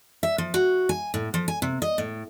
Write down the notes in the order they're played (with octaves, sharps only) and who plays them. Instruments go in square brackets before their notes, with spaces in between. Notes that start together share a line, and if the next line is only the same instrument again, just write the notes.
[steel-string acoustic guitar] E5
F3
F#4
G#5
A2
F3
G#5
C3
D#5
A2